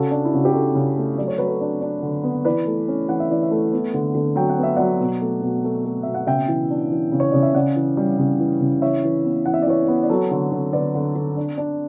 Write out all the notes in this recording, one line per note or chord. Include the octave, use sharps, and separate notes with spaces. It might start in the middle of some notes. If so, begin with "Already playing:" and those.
Already playing: C#3 F#4 A4
D4
E4
C#3 F#4
G4
D4 F#4 A4
C#3
A3
F#3 D5
C#5
F#3 B4
A4 C#5
D4
D4
D3
B3
E3 B4 D5
A3
C#4
E3 F#5
E5
E3 D5
C#5 E5
A3
B3
D3
D3
F#3 G5
F#5
B3
E5
F#3 D5 F#5
B2
A3
B2
A3
A3
B2 E5
F#5
C#3 E5 G5
E3
D4
E3
C#3
C#5
C#3 D5
E5
C#3 D5 F#5
E3
G3
C#3
E3
C#3
E3 C#5 E5
E3
B3
E3 F#5
E5
D5
E3 C#5 E5
B3
D5
F#3 A4 C#5
D3
D3
D3 B4 D5
D3
D3
D4
D4